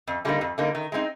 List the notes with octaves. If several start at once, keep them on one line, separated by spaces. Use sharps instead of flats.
F2
D3 G3 A#3 D#4
F2
D3 G3 A#3 D#4
D#3
G#3 C4 D#4